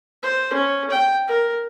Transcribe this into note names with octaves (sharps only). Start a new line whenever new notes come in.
C5
C#4
G5
A#4